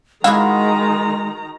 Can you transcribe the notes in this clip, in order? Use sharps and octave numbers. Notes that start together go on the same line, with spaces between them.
D#3 G#3 E4 F#4 G#4 F5 A#5